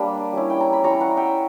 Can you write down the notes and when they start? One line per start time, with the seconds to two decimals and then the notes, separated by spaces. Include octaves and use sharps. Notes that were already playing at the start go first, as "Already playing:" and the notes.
Already playing: G3 A#3 D4 B5
0.33 G3 C#4 E4
0.50 G5
0.61 A#5
0.73 B5
0.84 G3 C#4 E4 A#5 C#6
1.00 F#5 A#5
1.17 E5 G5